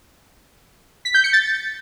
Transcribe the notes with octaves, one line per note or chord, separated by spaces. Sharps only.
B6
G6
C#7
A6